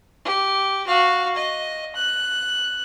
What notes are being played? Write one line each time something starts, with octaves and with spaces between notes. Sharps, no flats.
G4
F#4 F5
D#5
F#6